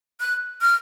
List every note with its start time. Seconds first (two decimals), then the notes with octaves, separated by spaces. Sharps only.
0.20 F#6
0.61 F6